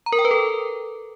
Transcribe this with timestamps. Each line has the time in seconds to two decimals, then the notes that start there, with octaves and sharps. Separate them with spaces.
0.06 A#5
0.12 A#4
0.19 G5
0.25 B4
0.31 A4